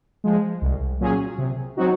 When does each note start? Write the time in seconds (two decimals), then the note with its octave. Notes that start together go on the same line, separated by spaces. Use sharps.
0.24 F3 G#3
0.62 C2
1.00 A#2 F#3 C#4 G#4
1.38 C3
1.77 F#3 C4 D#4 F#4